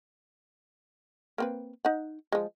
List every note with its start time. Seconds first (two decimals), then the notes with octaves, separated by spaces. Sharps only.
1.38 A#3 C4 B4
1.85 D#4 F#5
2.32 F3 G#3